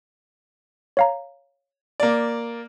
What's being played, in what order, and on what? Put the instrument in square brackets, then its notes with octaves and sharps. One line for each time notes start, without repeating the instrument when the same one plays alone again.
[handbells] C#5 F5 A#5
[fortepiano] A#3 D5